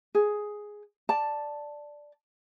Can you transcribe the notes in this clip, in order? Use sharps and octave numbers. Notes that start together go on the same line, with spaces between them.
G#4
D5 A5